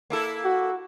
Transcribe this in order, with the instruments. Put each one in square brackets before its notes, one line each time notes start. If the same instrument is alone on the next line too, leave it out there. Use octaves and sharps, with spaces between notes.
[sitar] A#3 E4 A4
[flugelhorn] F#4